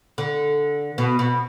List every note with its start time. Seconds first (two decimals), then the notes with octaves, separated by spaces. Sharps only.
0.18 D3
0.98 B2
1.19 B2